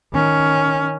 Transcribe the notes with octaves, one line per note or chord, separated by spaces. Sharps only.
D#3 C#4